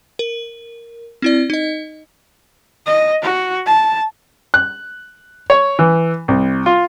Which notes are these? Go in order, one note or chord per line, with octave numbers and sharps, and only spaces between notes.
A#4
C4 E4 D5
D#4 D#5
D#5
F#4
A5
F#6
C#5
E3
C2
F4